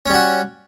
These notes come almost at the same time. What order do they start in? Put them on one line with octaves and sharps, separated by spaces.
C#4 G3 F#4